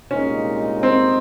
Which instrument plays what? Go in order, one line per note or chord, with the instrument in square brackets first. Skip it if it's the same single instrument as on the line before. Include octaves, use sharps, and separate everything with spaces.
[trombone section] C2 A#2 G#3 D#4 [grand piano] C#4
[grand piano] C4